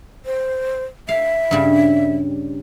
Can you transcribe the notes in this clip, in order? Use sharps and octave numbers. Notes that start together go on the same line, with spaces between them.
C5
E5 F5
G2 C#3 G3